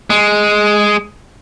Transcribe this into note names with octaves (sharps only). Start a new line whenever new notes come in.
G#3